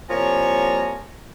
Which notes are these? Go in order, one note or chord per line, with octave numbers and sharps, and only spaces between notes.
C2 F3 A#3 C#5 G#5 A#5